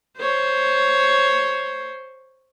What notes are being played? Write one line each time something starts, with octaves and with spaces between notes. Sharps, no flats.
C5 C#5